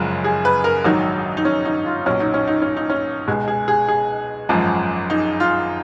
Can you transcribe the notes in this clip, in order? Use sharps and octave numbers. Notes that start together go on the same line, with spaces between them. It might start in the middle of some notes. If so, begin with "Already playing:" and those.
Already playing: F#1 F#2 C#3 F3 G#3
G#4
B4
A#4
A#1 G#2 D#3 F#3 D#4
D#4
C#4
D#4
F4
B1 A#2 F#3 C#4
D#4
C#4
D#4
C#4
D#4
C#4
C#2 B2 G#3 G#4
G#4
G#4
G#4
G#1 F#2 F3 G#3
D#4
F4